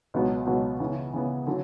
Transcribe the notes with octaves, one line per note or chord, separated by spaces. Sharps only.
C#2 B2 F#3 B3
C#2 B2 F#3 B3
C#3 E3 B3
C#3 E3 B3
D3 F#3